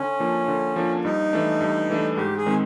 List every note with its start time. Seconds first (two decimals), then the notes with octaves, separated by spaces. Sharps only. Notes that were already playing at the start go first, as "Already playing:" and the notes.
Already playing: D3 C#4
0.20 F3 A#3 D4
0.48 D3
0.76 F3 A#3 D4
1.05 G2 D#4
1.33 E3 A3 D4
1.61 G2
1.90 E3 A3 D4
2.17 G#2 G4
2.37 G#4
2.46 D#3 G#3 C4 D#4